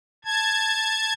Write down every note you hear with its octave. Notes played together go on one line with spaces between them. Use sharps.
A5 G#6